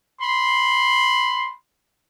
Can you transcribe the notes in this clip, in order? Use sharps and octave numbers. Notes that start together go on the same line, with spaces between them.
B5 C6